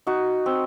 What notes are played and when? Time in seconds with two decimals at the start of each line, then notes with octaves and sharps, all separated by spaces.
0.07 D#4 F#4
0.46 C4